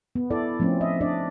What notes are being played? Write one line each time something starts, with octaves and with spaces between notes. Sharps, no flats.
B3
E4 A4 D5
F3 A3 C4 C#4
D#5 E5
D4 D5 D#5